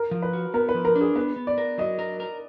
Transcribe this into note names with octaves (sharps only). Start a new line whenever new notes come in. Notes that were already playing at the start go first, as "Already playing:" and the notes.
Already playing: A#4
F3
B4
F#4
B3 A#4
B4
F3
A#4
D4
G#4
B3 B4
B3
D5
A#4
F#3 D#5
A#4
A#4